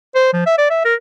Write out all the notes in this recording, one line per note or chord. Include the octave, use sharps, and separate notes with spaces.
C5
F3
E5
D5
E5
A#4